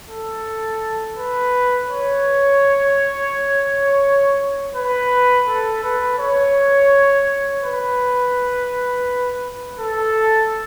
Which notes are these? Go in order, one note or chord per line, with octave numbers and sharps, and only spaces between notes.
A4
B4
C#5
B4
A4
B4
C#5
B4
A4